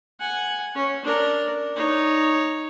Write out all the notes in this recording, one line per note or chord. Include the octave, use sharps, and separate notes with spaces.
F#5 G#5
C#4
D4 A#4
D#4 C#5